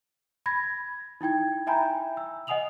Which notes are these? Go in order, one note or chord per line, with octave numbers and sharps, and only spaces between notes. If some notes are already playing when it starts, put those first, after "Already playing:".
B5 G#6 A#6
D#4 E4 G5 G#6
E5 G5 G#5 A#5 B5 G6
E6
D#5 F#5 G#5 D#6 F7 F#7